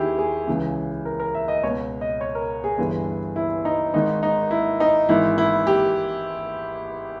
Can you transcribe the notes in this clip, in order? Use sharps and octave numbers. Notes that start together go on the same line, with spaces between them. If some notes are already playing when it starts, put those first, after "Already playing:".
Already playing: D#2 D#3 E4 G4 G#4
G#4
C#2 C#3 E3
A#4
A#4
E5
D#5
C#2 B2 C#5
D#5
C#5
A#4
G#4
G1 G2 E3
E4
D#4
G#1 G#2 D#3 D#4
D#4
E4
D#4
G#1 G#2 E3 E4
E4
G4